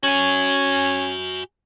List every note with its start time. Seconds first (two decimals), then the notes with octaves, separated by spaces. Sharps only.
0.04 C#4 F#4 G#5